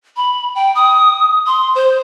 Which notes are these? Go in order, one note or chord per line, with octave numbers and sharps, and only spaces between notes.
B5
G5
D#6
C6
C5